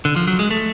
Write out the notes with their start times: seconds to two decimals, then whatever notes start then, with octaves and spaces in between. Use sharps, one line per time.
0.05 D3
0.16 F3
0.27 F#3
0.39 G#3
0.51 A3